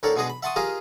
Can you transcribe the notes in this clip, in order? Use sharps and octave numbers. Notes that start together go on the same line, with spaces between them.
D2 A2 A4 A#4 C#5 D5
B2 G#3 D4 G#4 D#5
B5
E5 F#5 A5 C6 C#6 D#6
F4 G4 G#4 A#4 D#5 F5